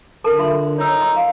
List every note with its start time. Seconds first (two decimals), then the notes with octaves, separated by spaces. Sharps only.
0.24 D3 A4 A#4 A5
0.38 F4 E5 C6
0.78 D#4 C#5 E6
1.01 D#5 C6
1.16 F5